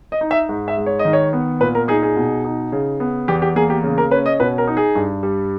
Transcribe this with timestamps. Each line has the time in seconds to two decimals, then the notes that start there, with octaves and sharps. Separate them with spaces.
0.12 D#5
0.21 D#4
0.31 E5
0.49 G#2
0.68 E5
0.77 G#3
0.86 C#5
0.99 D#5
1.05 D#3
1.13 C#5
1.33 B3
1.60 A#2 B4
1.75 A#4
1.88 D#4 G#4
2.03 G#4
2.17 B2
2.45 D#4
2.72 C#3
3.00 B3
3.28 E2 G4
3.42 G4
3.56 A#3 G#4
3.70 G4
3.84 C#3
3.98 A#4
4.11 C#4 B4
4.26 D#5
4.40 B2 B4
4.58 A#4
4.67 D#4
4.77 G#4
4.95 G2
5.23 G3